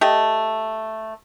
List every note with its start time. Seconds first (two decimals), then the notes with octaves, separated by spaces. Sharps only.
0.01 A3 G4 D#5